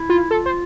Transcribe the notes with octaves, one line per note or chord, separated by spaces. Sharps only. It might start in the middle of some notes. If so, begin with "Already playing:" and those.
Already playing: E4
F4
F4 A4
C5